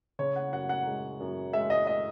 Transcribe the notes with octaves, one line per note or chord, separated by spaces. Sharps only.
C#3 C#5
F#5
F#2 F#5
F#5
G#3
F#2
G#3 E5
D#5
D#5